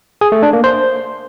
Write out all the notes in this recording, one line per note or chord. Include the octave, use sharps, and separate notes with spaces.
G#4
A3
D4
A#3
C5